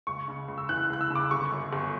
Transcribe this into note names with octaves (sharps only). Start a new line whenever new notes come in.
C#2 C#6
C#3
C#2
E6
E3 F#6
C#2 F#6
E6
C#3
D6
G1 C#6
F#2
G1